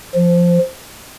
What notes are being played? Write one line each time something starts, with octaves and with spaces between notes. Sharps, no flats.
F3